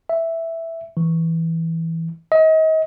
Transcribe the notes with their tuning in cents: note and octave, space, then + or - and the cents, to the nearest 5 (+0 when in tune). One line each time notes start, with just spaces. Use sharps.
E5 +0
E3 -5
D#5 +35